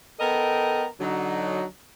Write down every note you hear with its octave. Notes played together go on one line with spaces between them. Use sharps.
B3 A4 A#4 D#5 G5
D3 F#3 D#4